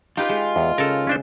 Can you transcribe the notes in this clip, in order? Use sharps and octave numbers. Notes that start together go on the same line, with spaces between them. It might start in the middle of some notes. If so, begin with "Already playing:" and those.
D#4 F4 G4 B4
G#3
E2
C#3 A4 A#4
C#4 D4 C5